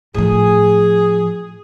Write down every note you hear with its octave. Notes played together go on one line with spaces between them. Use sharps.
A2 F3 G#4